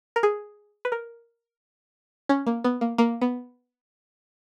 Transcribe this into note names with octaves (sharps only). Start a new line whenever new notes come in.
A#4
G#4
B4
A#4
C#4
A#3
B3
A#3
A#3
B3